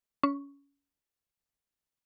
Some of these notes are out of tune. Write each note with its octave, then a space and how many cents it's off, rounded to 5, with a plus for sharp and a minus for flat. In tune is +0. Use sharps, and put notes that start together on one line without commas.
C#4 +20 C#6 +0